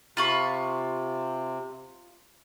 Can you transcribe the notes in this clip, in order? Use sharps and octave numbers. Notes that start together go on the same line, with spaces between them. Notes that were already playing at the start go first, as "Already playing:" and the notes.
C3 F4 B5 C#6